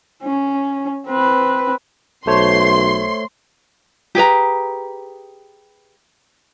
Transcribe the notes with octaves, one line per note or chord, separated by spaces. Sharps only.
C#4
C4 B4
B1 A3 C5 C#5 C6
G4 G#4 B4 A#5